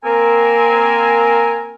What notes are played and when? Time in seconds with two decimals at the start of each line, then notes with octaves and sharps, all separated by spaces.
0.05 A#3 C4 A#4 G#5